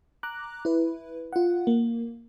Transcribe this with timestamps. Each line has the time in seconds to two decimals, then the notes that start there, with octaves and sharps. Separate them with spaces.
0.23 A#5 D6 F#6
0.65 E4 B4
1.33 F4 F#5
1.67 A#3